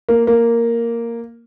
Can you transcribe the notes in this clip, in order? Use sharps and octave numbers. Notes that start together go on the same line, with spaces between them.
A#3
A#3